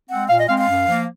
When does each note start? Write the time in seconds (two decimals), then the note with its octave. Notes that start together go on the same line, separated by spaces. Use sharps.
0.09 G#3 C4 F#5
0.28 A#2 F5
0.38 D#5
0.48 G#3 C4 F5
0.58 F5
0.67 F#2
0.86 F3 A#3